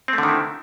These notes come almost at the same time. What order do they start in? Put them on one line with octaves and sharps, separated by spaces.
C4 A3 D3 D#3 E4